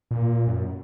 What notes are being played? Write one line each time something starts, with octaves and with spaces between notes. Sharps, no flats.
A#2
F#2